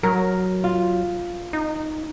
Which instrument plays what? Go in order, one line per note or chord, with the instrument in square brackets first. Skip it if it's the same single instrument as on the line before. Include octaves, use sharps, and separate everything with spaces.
[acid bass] F#3 [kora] A#4
[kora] F4
[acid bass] D#4